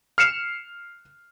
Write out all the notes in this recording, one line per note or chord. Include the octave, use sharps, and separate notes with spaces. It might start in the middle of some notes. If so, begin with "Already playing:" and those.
F6 C7 C#7 E7